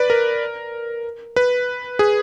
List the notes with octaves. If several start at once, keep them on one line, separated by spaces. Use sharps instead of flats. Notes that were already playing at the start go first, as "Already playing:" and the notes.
Already playing: B4 D5
A#4
B4
G#4